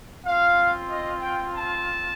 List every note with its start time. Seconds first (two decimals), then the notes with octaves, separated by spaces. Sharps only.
0.25 C4 F4 F5
0.90 D#5
1.22 G5
1.55 A5